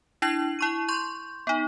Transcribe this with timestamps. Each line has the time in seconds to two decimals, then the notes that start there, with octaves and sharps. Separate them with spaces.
0.22 D4 E4 G#6 C7 F#7
0.59 E4 C#6 D#7
0.88 C6 C#6 G6
1.47 B3 D#4